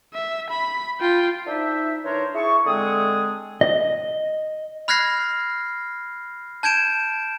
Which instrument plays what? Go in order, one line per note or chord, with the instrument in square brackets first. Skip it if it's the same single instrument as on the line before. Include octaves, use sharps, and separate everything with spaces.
[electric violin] E5
B5
F4 G5
[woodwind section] D4 D#4 C5 E5
E3 D4 D#4 A#4 C5 C#5
E4 G#4 A5 C#6
D3 G#3 C4 G#4 D#6
[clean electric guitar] D#5
[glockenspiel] B5 F6 F#6 G#6 A#6 C7
A5 G6 G#6 D7 E7